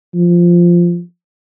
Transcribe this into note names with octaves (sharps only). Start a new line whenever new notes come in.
F3